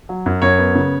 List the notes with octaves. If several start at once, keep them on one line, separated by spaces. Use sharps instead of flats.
F#3
F#2
F#2 C#5
B3
C#3